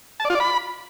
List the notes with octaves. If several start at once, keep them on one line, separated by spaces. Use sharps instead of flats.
A5
D5
F4
D5
B5